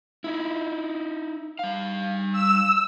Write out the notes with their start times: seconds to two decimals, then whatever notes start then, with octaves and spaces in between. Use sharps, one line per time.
0.24 D#4 E4
1.59 G3 F5
2.32 E6